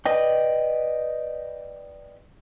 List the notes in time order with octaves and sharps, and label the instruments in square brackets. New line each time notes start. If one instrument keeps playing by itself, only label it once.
[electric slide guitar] B4 D5 D#5 G5